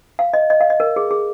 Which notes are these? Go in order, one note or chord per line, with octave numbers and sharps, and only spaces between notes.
F5
D#5
D#5
F5
D#5
A#4
G#4
G#4